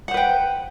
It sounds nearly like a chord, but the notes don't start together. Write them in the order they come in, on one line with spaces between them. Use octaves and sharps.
F#5 C5 B4 G5